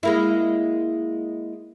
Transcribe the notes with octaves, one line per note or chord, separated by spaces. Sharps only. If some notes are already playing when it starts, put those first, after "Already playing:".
G#3 A#3 E4